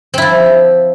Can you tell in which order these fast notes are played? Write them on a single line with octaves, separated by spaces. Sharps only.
C4 E4 F3